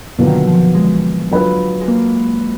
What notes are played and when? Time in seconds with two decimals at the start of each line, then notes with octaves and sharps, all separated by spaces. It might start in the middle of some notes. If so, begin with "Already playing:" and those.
0.18 B2 D3 F#3 A#3 F4
0.26 D#3
0.34 D3
0.47 F3
0.75 G#3
1.31 F#3 D4 F4 B4
1.81 G#3
1.88 A#3